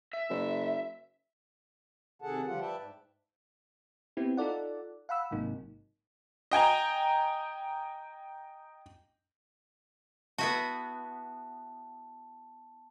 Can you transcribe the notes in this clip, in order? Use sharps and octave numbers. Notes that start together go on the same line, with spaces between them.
E5
F#1
C3 D#3 G#4 A4 F#5 A5
D3 F3 G3 F4 G4 F#5
B4 D5 E5 G5 A5
G#2
B3 C4 E4 G4
D#4 F4 A4 D5 F#5
F5 F#5 B5 E6
A1 G#2 C3 F#3 A#3 D#4
D#5 G5 G#5 A#5
B3 E4 F#4 A5